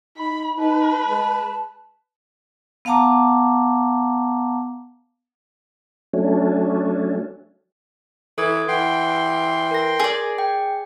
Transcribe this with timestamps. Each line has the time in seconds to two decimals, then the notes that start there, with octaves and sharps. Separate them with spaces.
0.17 D#4 B5
0.58 D#4 B4 A5
1.08 G#3 A5
2.85 B3 F5 F#5 A5 A#5 D6
6.14 F#3 A3 C#4 D4
8.38 E3 A4 D#6 G#6
8.68 E3 F#5 G5 C6
9.71 A#4 A#6
10.00 G#4 D5
10.38 G5